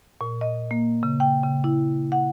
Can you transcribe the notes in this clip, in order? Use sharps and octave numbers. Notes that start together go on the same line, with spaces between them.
A#2
D#5
A#3
C#3
G5
C#3
E4
F#5